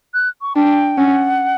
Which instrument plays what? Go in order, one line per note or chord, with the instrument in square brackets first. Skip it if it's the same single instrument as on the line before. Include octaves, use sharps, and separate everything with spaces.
[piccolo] F#6
C#6
[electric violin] D4 [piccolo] G5
[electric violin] C#4 [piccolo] F#5